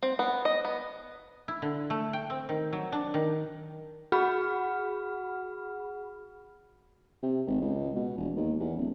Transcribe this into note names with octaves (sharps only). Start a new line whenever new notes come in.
C4
B3
D#5
B3
E4
D3
A3
G5
C4
D#3
F#3
D4
D#3
F#4 G#4 F#5 B5 F6
C3
G#1
C#2
B2
E1
D#2
E2
D1